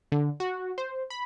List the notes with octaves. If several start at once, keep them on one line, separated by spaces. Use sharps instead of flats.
D3
F#4
C5
B5